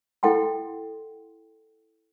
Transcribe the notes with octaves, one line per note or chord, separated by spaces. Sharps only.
E4 A4 F#5 G5 C6